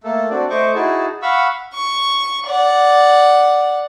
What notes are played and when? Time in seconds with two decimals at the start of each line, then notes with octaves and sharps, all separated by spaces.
0.04 A3 A#3 A4
0.30 C4 D4 F#4 D5
0.50 A3 C5 D#5 C#6 D6
0.75 D#4 E4 F#4 G#4 A5
1.22 F5 F#5 B5 C#6 E6
1.74 C#6
2.47 D5 F#5